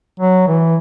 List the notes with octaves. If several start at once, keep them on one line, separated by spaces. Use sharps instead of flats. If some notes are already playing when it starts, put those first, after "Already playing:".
F#3
E3